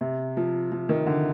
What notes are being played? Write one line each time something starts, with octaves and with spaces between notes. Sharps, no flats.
C3
F3
F3
D#3
D3